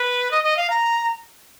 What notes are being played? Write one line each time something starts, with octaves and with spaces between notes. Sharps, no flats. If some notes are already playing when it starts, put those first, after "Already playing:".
Already playing: B4
D#5
D#5
F5
A#5